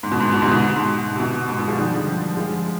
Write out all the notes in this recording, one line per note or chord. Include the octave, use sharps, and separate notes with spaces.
G#2
B2
G#2
B2
G#2 C3
B2
G#2
C3
B2
G#2
B2
F3 G#3
D#3 G3
D3 F3
F3 G#3